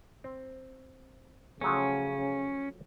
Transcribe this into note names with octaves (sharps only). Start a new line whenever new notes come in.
C4
C#3 F3 F#3 A3 C#4